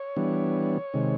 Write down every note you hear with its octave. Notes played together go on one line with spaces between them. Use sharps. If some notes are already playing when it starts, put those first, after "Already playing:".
Already playing: C#5
E3 G3 B3 D4
C3 D#3 G#3